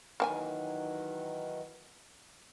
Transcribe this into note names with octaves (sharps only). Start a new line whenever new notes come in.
D#3 E3 F#3 A#3 G5 G#5